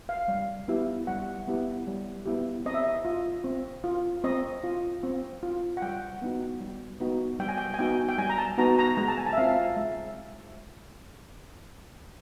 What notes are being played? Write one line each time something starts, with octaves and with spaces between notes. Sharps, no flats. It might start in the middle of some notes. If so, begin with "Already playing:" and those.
F5
G3
B3 E4 G4
G3 F#5
B3 E4 G4
G3
B3 E4 G4
C4 D#5
E5
D#5
F4
C4
F4
C4 D#5
F4
C4
F4
F#5
G3 G5
B3 D#4 F#4
G3
B3 D#4 F#4
G3 G5
G#5
G5
G#5
B3 D#4 F#4 G5
G5
G3 G#5
A#5
A5
B3 D#4 F#4 A#5
A#5
G#3 A#5
A5
G#5
A5
E5
C4 F4 F5
G#3 E5